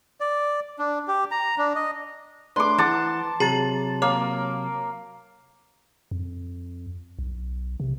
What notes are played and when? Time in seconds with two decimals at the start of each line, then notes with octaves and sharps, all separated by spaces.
0.20 D5
0.79 D4
1.08 G4
1.31 A#5
1.58 D4
1.76 D#5
2.56 A3 D4 B4 C6 D6
2.78 E3 F#5 A5 D6
3.40 C3 F#3 G#4 A#5 A6
4.02 A#3 C#5
6.11 F2
7.19 B1
7.80 C3